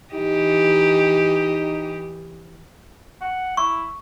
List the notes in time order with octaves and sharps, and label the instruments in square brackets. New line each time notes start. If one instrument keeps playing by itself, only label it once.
[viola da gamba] E3 G4 D#5 [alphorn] D#4
[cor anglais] F#5
[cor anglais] E4 [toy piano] C#6